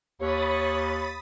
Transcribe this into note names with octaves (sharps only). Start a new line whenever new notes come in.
D#2 C#5 B5 D#6 A6